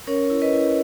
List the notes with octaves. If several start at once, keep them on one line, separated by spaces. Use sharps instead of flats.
C#4 A#4 C#5
E4
B4 D#5
E4